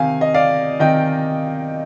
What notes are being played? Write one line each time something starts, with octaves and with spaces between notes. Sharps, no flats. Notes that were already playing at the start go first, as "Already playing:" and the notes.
Already playing: C3 D#3 F5 G#5
D#5
D5 F5
C3 D#3 D#5 G5